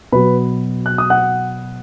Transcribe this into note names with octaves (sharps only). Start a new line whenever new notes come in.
B2 F#3 B3 B4 B5
F#6
D#6
F#5 F#6